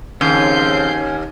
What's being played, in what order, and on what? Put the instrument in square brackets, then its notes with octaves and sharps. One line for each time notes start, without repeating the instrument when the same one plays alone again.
[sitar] D#2 [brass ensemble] C#3 F3 C4 [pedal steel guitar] C#4 [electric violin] G6 C7